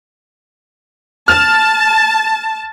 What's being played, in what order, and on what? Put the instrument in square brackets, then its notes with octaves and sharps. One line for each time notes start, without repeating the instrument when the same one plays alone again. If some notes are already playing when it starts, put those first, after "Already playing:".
[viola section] A5 [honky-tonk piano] F6